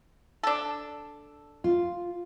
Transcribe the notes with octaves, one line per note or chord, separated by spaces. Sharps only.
D4 A4
F4